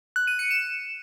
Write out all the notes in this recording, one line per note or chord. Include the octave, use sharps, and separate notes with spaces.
F#6
D#7
C#7
E7